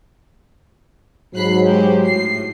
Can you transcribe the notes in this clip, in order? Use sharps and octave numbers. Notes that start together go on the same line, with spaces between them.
G#2 F#3 B5 F#6 C7
G#3 G4 C5
A2 C7